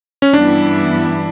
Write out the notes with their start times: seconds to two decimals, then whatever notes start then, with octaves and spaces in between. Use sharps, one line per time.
0.22 C#4
0.33 G2 E3 G3 B3 D4 E4